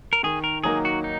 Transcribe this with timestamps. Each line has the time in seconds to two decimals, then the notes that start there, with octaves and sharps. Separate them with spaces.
0.13 A#4
0.23 D#3 G#4
0.44 A#4
0.64 F#3 A#3 D#4 G#4
0.85 F#4
1.04 D#4